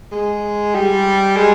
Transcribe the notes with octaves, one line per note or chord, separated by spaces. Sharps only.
G#3
G3
G#3